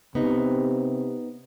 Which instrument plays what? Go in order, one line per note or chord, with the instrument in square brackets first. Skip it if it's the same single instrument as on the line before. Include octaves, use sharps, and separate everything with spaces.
[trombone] C3 [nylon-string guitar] B3 D#4